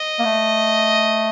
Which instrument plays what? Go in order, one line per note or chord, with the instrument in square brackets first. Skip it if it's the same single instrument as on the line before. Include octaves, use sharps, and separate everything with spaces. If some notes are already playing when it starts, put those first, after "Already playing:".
Already playing: [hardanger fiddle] D#5
[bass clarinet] A#3
A3